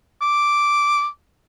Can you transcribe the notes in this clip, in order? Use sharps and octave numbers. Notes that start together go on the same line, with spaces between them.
D6